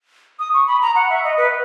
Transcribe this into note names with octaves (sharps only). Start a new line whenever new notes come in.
D#6
C#6
B5
A#5
F#5
E5
D#5
B4